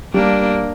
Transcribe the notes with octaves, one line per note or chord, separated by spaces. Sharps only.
G3 A#3 D4